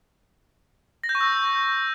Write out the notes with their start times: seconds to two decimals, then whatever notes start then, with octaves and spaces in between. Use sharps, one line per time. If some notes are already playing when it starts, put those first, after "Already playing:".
1.04 A#6
1.09 G6
1.15 C#6
1.21 E6